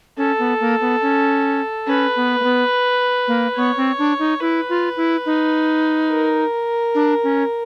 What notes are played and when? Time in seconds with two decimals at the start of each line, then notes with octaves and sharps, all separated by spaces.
0.17 C#4 A4
0.39 B3
0.60 A#3
0.81 B3
1.02 C#4
1.87 C#4 B4
2.16 B3
2.40 A#3
2.44 B3
3.28 A#3
3.56 B3 C#5
3.77 C4
3.99 D4
4.19 D#4
4.41 E4 B4
4.69 F4
4.97 E4
5.26 D#4
6.10 A#4
6.95 D4
7.23 C#4